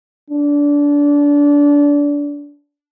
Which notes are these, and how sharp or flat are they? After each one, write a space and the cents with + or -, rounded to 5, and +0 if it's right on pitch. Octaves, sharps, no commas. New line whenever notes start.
D4 -25